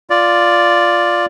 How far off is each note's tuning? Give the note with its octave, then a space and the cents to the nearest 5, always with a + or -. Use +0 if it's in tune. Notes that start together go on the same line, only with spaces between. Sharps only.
F4 +0 D5 +0